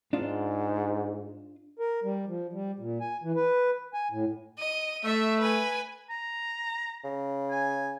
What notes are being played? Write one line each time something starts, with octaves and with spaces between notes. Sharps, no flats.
G#2 D4 D#4 F4
A#4
G3
F3
G3
A#2
G#5
E3
B4
G#5
A2
D#5 D#7
A3 E5
B4 G#5
A#5
C#3
G#5